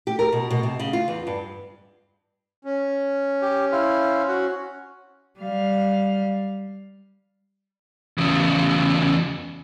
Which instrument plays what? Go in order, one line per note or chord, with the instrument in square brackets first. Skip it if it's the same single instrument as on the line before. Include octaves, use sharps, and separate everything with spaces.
[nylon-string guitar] G4
A#4
B2
B2
C3
C#3
F4
E2
G2
[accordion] C#4
[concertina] G4
E4 C5 F5
F#4
[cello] G3 F5
[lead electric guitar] E2 C#3